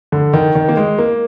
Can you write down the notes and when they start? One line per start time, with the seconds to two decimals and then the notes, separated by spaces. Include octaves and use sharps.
0.12 D3
0.33 D#3
0.55 D#3
0.69 A#3
0.77 G#3
0.98 A#3